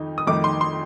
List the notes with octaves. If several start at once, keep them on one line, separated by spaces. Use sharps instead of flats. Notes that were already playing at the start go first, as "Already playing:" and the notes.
Already playing: F2 D#3 D#4
D#6
F2 D#3 A3 D#4 D6
C6
C6